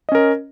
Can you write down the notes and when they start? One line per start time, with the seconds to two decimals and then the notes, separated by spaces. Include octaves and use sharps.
0.09 D#5
0.12 C#4
0.15 A#4